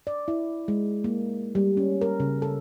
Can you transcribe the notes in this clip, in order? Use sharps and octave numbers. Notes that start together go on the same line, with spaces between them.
D5
E4
G#3
A#3
G3
C#4
A#4
C#3
A4